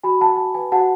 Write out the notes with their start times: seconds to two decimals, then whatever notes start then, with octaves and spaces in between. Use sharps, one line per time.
0.03 F#4 G#5 B5
0.20 F#4 F#5 A5
0.37 F#4 G#5
0.54 B4 G#5
0.72 F#4 F#5 A5